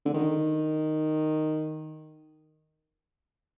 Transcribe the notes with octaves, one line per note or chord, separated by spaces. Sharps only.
D3
D#3